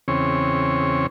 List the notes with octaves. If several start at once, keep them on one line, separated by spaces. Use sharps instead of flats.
E2 C#3 C4 C#5